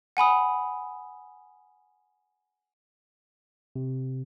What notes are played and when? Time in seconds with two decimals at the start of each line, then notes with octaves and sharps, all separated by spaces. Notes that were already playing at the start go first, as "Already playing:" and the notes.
0.17 F#5 G#5 B5 D#6
3.76 C3